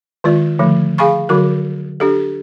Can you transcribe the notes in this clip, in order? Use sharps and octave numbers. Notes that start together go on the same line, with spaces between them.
D#3 G#3 F4 D5
D3 F3 A3
G#4 F5 G#5 B5 C#6
D3 F#3 F#4 A#4
D4 G4 A4